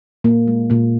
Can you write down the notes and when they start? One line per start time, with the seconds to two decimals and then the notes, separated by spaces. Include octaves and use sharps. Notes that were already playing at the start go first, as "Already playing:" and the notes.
0.24 A#2 A#3
0.47 G#3
0.70 A#2 A#3